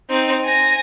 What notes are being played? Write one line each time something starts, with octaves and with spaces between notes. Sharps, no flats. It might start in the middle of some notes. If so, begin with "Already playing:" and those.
C4 D#4
G#5 A#6